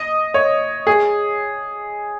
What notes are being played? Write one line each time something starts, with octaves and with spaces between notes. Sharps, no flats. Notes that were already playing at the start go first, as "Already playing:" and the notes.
Already playing: D#5
C#5
G#4